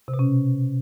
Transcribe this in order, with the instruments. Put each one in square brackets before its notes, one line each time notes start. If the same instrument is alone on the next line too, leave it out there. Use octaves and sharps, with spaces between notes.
[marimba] C3
B2
C#4